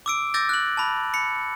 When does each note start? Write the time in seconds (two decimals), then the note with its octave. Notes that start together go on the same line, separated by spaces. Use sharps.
0.06 D6 E6 D7
0.34 D6 E6 G6 A6 A#6
0.49 F#6 F#7
0.77 A5 B5
1.14 B5 C#7